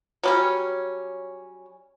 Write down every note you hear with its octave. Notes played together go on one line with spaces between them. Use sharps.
F#3 G3 C#4